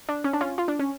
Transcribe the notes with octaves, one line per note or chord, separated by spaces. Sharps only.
D4
C#4
D4
C#4 F4
F4
D4
C#4